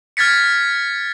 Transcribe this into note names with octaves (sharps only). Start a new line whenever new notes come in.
F6 G#6 A6 B6 C#7